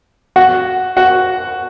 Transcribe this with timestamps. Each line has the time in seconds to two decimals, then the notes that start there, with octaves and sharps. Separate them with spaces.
0.36 F#4 F#5
0.97 F#4 F#5